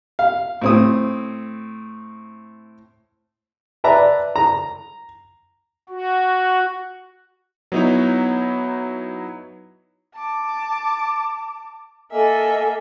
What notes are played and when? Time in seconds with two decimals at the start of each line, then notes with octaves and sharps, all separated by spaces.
0.19 F5
0.61 A2 C4 D#6
3.84 B4 D5 E5 A5 A#5
4.36 A#5
5.89 F#4
7.72 F#3 B3 D#4 E4 C#5
10.14 A5 D6
12.11 A#3 A4 D#5 E5 G#5